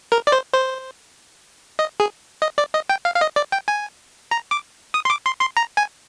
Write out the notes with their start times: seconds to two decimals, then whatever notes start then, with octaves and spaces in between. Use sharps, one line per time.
0.12 A#4
0.27 D5
0.32 C5
0.53 C5
1.79 D#5
2.00 G#4
2.42 D#5
2.58 D5
2.74 D#5
2.90 G5
3.05 F5
3.16 F5
3.21 D#5
3.36 D5
3.52 G5
3.68 G#5
4.31 A#5
4.51 D6
4.94 D#6
5.05 C6
5.10 D6
5.26 C6
5.41 C6
5.57 A#5
5.77 G#5